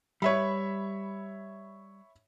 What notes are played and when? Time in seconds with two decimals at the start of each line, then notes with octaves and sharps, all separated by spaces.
0.22 G3 B4 C#5 E5 B5